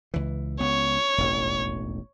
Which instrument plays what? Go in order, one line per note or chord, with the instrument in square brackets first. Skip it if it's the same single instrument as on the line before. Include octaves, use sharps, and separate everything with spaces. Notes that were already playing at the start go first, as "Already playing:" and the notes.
[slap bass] C#2 E3
[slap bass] C#2 B3 [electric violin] C#5
[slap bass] E1 A1 D#2